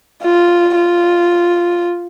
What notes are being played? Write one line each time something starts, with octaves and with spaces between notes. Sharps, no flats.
F4
F4